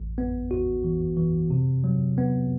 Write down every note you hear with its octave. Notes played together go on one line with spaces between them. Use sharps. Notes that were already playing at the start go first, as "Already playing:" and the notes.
Already playing: A1
B3
F#4
E3
E3
C3
F#3
B3